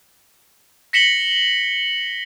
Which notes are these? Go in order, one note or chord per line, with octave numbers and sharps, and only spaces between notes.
A#6 B6 C#7 E7 F#7 G7